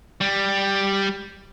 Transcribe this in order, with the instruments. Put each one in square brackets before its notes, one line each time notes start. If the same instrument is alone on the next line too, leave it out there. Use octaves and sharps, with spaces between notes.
[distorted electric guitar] G3